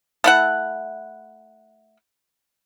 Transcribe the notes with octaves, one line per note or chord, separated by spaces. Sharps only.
A3 E4 F#5